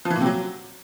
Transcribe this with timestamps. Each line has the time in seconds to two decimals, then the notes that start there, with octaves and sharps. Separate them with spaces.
0.05 F3
0.10 E3
0.16 A#2
0.21 C3
0.26 F#3